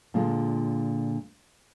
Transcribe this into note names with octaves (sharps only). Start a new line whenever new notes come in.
A#2 D3 G#3 F4